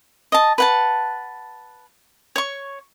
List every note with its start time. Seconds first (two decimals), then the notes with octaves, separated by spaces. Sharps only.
0.32 D#5 A5
0.58 B4 F#5 A5
2.36 C#5 C#6